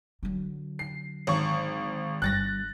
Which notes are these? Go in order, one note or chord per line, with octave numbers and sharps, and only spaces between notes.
D3 F#3
C7
G#1 C#6
G1 G3 F#6 A6 A#6